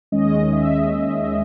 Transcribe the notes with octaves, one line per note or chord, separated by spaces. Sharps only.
D#2 D#3 G#3 C#4 D#5
E5